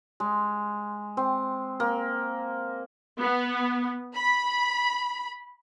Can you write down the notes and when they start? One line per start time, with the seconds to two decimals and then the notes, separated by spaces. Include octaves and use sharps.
0.20 G#3
1.17 C4
1.80 A#3
3.21 B3
4.17 B5